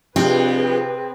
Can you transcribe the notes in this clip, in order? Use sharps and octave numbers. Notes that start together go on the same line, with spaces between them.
F2 C3 C4 D4 G#4 B4